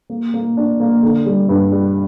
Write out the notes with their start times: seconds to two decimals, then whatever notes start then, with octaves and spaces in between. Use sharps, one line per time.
0.10 A#3
0.34 A#3
0.57 D4
0.80 A#3
1.02 D3
1.26 G3
1.49 G2
1.72 G3